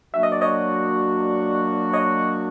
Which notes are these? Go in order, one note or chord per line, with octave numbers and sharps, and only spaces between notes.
F#3 A#3 D4 F#4 E5
D#5
D5
C#5 D#5
C#5 D#5